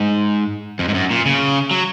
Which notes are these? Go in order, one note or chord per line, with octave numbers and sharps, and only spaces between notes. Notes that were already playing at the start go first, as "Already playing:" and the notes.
Already playing: G#2
F2
G#2
F#2
A#2
C#3
F#3